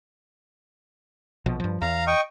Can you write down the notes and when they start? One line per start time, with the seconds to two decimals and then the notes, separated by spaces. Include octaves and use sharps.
1.46 A#1 B2 F3
1.60 G2 F3
1.82 E2 F5 A#5
2.07 D#5 G5 C#6